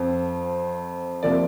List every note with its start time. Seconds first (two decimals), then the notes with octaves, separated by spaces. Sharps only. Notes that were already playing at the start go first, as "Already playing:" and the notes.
Already playing: F2 F3 C4
1.23 C3 F3 A#3 D5